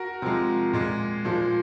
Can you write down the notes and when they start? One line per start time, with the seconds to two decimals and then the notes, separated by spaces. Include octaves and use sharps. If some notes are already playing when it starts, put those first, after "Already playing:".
Already playing: F#4 A#4
0.22 C3 F3 G#3
0.73 A#2 G#3
1.25 A#2 F3 G#3